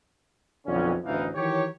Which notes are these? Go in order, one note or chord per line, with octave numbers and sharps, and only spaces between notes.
B1 F2 D3 C#4
A1 D2 B2 E3 D#4 F5
D#3 E3 F#3 G4 C#5